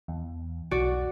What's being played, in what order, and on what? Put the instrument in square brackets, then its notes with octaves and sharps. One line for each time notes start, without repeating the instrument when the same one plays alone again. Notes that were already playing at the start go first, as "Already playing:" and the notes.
[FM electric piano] E2
[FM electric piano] B1 [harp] F#4 D5